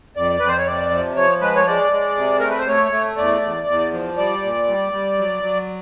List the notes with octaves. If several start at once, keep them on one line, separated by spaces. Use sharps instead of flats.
F2 D5
F2 B4
C5
C#5
C3 D5
F3
F3 C#5
G#3 B4
C#5
G#3 D5
G#3
C3
A3 A#4
B4
C5
A3 C#5
A3
E2 D5
E2
E2
F3
G3 D5
A#2
G3
G3
F#3
F#3